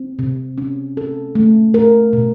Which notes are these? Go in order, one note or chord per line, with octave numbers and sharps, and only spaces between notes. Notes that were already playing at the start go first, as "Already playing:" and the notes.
Already playing: C4
C3
C#4
A4
A3
A#4
B2